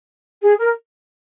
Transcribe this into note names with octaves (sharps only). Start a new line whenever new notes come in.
G#4
A#4